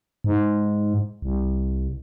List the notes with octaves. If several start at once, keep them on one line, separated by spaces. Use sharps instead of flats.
G#2
C2